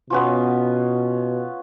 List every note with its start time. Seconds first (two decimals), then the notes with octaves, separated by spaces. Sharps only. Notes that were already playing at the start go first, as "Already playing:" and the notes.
0.10 B2 B3 C#4 F4